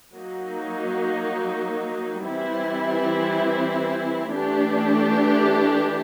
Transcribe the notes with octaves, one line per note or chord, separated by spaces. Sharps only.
F#3 A#3 D#4
E3 G3 C4 E4
E3 A3 D4 G4